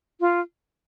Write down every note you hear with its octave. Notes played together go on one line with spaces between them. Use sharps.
F4